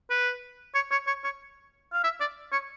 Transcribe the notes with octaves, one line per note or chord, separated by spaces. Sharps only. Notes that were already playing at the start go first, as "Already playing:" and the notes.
B4
C#5
C#5
C#5
C#5
F5
E5
D5
C#5